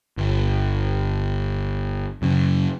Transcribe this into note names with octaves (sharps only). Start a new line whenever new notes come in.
G1
F#2 C#3